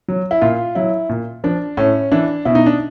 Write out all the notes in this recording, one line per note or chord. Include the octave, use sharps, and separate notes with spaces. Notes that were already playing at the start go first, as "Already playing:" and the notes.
F#3
E4
A#2 F4
F#3 E4
A#2
F3 D4
A2 C#4
E3 D4
B2 E4
D#4
D4